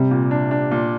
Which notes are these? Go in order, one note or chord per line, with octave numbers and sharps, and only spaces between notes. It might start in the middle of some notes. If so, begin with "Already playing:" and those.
Already playing: C3 G3
A#2
D4
D4
A#2